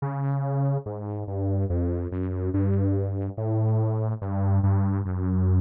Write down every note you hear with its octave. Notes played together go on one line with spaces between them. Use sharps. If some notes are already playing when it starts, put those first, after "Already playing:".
C#3
G#2
G2
F2
F#2
G2
A2
G2
G2
F#2